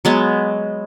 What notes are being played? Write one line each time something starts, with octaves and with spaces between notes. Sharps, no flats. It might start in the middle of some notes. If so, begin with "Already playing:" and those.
F#3 G#3 B3